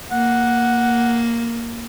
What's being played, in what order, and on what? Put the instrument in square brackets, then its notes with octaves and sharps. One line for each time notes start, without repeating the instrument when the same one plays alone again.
[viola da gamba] A#3 [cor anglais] F#5